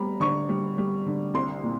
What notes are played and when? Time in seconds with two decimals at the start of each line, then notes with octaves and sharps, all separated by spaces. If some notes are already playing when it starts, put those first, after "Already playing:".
Already playing: G3 B3 A#5 B5
0.20 D3 C#6
0.49 G3
0.78 G3
1.06 D3
1.34 C2 C6
1.63 A#2